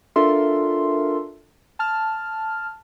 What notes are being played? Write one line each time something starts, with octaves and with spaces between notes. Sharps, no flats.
D4 F4 A4 A#4 E5 C6
A5 F6